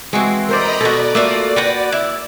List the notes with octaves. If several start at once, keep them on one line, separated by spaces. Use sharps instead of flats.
E3 G#3 C4 F#4
A#4 C5 D5 D#5 A#5 B5
B2 F#4 A4 D5
A3 A#3 F4 F#4
F#4 B4 F#5 G5
E4